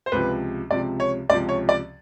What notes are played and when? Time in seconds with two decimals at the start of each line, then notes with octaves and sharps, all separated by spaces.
0.06 C5
0.12 C#2 C3 F3 B4
0.71 C#2 C3 F3 D5
1.00 C#5
1.29 C#2 C3 F3 D5
1.49 C#5
1.69 D5